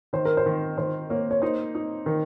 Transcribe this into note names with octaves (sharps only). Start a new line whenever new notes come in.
D#3 C5
A#4
C5
D#3
D#3 C5
A#3 C#5
C#5
D#4 C5
D#4
D#3 A#4